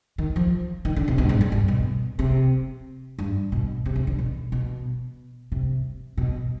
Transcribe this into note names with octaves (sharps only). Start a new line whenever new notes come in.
D#3
F3
D#3
D3
C3
B2
G2
G#2
F2
G2
B2
C3
G2
B2
C3
C3
D3
B2
B2
C3
B2